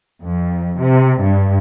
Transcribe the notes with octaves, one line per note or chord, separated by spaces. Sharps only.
F2
C3
G2